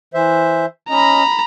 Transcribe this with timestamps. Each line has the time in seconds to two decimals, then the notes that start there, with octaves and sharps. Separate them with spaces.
0.14 E3 C5 E5
0.90 C#4 D#5 A#5 B5